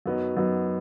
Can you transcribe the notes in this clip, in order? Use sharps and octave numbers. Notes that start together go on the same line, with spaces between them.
F#2 F#3 B3 D#4
F#2 F#3 B3 D#4